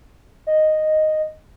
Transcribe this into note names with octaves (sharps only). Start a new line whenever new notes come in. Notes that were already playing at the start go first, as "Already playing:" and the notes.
D#5